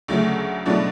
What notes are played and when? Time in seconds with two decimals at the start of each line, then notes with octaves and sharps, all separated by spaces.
0.08 D2 C#3 F#3 A3
0.66 B2 F#3 A3 D4